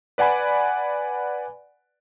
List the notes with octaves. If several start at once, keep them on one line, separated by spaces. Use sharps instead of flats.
B4 D5 F#5 G#5 B5